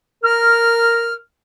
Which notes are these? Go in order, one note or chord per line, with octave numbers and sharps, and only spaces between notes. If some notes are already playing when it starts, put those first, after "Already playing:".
A#4 F6